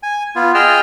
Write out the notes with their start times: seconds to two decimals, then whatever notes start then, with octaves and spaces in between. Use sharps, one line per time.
0.03 G#5
0.36 B3 F4
0.55 G#4 D#5 G5 E6 F6